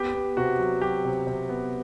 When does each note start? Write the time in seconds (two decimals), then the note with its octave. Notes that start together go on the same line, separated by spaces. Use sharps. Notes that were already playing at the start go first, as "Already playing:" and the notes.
Already playing: B3 G4
0.14 B3
0.37 C3 F#4
0.59 F#3
0.82 F#3 G4
1.05 C3
1.27 C3
1.49 B3